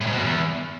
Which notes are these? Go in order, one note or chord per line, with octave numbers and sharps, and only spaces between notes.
A2
G#2
B2
G2
E2